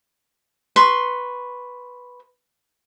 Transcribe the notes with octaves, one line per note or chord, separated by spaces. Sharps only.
B4 C6 C#6